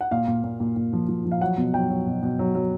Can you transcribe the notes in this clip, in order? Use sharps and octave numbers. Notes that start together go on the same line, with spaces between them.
F#5
A#2 F5
A#2
A#2
A#2
A#2
F3
F3
F3
F5
F#3 F#5
B2
F#3 G5
F#3
B2
B2
F#3
F#3